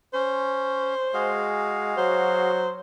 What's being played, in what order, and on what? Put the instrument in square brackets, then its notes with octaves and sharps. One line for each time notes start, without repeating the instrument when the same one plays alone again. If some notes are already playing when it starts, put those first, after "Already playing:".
[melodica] C#4 [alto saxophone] C5
[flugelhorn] G#3 [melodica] F#4 G#4 F5
[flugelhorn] F#3 [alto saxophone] C5